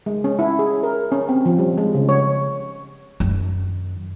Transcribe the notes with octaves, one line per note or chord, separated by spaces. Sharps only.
G#3
C#4
E4
G#4
A#4
C#4
C4
F3
G3
G#3
C#3
C#5
F#2 D#3